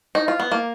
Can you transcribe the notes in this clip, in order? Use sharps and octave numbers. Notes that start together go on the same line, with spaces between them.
D#4
F4
B3
A#3